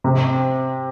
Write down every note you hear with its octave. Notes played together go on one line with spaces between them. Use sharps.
C3